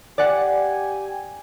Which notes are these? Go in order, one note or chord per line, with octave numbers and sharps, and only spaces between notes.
G4 D5 F#5 G#5